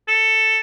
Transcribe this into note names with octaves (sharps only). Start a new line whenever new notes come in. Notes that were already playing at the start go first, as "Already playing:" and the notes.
A4